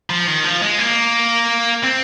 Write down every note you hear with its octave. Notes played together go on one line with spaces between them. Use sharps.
F3
D#3
F3
G#3
A#3
C4